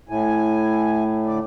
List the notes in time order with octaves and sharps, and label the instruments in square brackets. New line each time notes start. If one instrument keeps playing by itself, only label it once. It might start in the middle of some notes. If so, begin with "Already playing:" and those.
[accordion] A2 [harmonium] E4 G#5
[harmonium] D3 D5